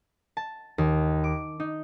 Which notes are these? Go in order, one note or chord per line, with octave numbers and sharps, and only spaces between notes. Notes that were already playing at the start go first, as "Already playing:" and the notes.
A5
D#2
D6
D#4